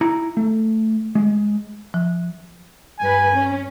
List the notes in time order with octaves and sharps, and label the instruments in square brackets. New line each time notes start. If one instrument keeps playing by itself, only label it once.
[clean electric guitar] E4 A#5
A3
G#3
[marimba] F3
[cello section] G2 B4 [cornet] G#5
[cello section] C#4